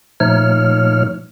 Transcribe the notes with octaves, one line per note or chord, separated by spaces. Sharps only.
A#2 F3 A3 D#4 C#5 F6